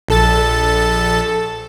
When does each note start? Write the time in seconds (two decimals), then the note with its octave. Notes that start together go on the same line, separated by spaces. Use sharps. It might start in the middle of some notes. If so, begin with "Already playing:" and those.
0.08 A#1 A4 A6